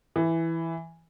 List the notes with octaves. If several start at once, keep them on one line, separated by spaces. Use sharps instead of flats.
E3